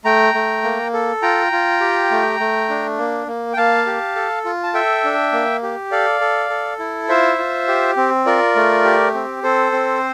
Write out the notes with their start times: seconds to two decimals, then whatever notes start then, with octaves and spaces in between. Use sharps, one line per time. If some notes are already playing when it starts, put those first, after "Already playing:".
0.05 A3 G5 A#5
0.34 A3
0.64 A#3
0.93 A4
1.22 F4 G5 A#5
1.52 F4
1.81 G4
2.11 A3
2.40 A3
2.69 D4
2.98 A#3
3.27 A#3
3.53 G5
3.57 A#3 F5 A5
3.86 G4
4.16 A4
4.45 F4
4.63 A5
4.74 A4 E5 G5
5.04 D4
5.32 A#3
5.63 G4
5.91 A4 D5 F5
6.21 A4
6.50 A4
6.79 E4
7.09 F4 C5 E5
7.38 F4
7.68 G4
7.97 C4
8.26 F4 A#4 D5
8.55 A3
8.84 G4
9.14 C4
9.43 C4 A4 C5
9.72 C4